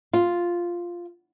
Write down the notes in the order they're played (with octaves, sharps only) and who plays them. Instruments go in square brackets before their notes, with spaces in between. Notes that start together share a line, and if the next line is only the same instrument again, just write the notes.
[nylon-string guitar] F4